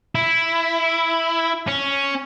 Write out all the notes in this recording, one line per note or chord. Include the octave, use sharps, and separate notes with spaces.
E4
C#4